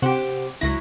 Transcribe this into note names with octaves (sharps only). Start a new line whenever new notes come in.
C3 G4 C5 F#5
C#2 F#3 E4 A#6